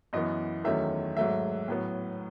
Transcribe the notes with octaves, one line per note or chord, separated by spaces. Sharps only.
F#2 E3 B3 D#5
E2 D#3 F#3 A3 C#4 E5
G#2 F#3 A3 E5
A2 F#3 B3